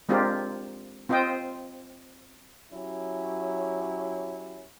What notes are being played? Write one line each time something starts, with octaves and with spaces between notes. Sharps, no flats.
G#3 C4 D4 F4 G4 A#4
C4 F4 C5 D#5 G5
F#3 C#4 E4 G4